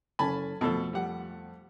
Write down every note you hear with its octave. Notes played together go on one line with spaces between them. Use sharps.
F#1 C#4 A4 G#5 A5 B5
F2 B2 A3 A4 A5
G3 F#5